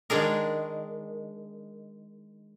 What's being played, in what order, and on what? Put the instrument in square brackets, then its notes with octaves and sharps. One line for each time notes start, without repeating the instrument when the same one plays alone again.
[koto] D#3 G#3 D4 G#4 A#4